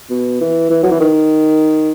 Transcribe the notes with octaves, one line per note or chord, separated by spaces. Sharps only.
B2
E3
E3
F#3
E3
D#3